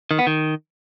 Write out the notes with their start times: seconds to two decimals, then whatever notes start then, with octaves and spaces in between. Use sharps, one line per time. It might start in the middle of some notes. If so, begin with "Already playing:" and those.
0.11 D#3
0.19 B3
0.27 D#3